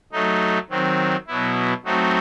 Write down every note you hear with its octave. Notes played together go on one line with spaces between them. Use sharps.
F#3 A3 D#4
D#3 F#3 C4
B2 F#3 B3 E4
F#3 A3 C4 D#4 F#4